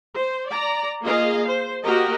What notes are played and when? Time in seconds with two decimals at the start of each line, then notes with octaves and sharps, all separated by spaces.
0.17 C5
0.48 D5 A#5
1.02 A#3 F4 G#4 D#5 F5
1.46 C5
1.85 A#3 F#4 G4 A#4 D#5